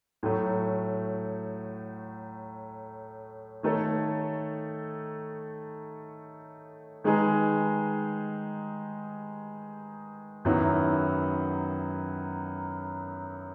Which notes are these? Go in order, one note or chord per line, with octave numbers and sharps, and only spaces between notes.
A2 F#3 A3
D#3 A3 D#4 A4 C#5
D#3 G#3 D#4 G#4 B4
F#2 D#3 F#3 B3 E4